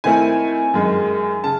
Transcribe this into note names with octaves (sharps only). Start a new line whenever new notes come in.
D#3 A3 C4 E4 G#5
F#2 D#3 G#3
C#3 A5